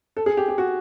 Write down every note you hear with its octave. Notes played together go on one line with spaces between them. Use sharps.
A4
G#4
G4
G4
F#4